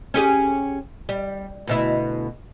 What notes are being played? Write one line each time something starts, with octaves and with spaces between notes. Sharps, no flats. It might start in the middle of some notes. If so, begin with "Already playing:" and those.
C#4 G4 G#4
G3
D2 B2 E4